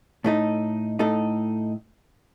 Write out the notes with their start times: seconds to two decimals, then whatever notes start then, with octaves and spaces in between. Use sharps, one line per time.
0.24 A2 A3 D#4 A4
0.99 A2 A3 D#4 A4